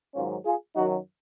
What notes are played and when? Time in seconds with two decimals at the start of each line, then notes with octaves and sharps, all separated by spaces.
0.14 G#2 D#3 F#3 C#4 F4
0.45 F4 G#4
0.75 F#2 D#3 F#3 D#4 F#4